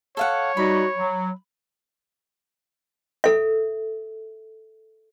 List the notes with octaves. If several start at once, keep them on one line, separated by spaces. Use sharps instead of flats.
A4 C#5 F5 F#5
G3 D#4 F#4 B5
F#3
A4 E5